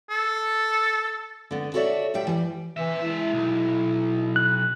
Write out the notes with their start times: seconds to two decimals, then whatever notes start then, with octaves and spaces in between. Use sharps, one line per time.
0.10 A4
1.51 D3 B3
1.74 F#4 A4 C#5 D5 E5
2.14 D2 A2 G3 E5 G5
2.27 E3 G3
2.77 E3 C4 E5
3.01 G#3 E4 E5
3.33 B1
4.36 F#6